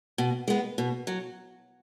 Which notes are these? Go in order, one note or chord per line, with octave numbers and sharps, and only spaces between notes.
B2
G#3 B3
B2
F#3